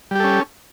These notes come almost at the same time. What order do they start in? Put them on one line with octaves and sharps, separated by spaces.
G3 G4 A4 C#4